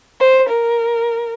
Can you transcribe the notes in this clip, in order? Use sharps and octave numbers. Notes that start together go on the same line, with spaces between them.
C5
A#4